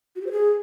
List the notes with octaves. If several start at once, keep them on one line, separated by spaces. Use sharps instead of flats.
F#4
G4
C5
G#4